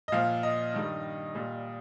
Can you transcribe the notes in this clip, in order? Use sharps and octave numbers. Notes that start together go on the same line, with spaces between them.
D#5
A#2 F3 F5
D#5
G2 D#3 G3
A#2 G3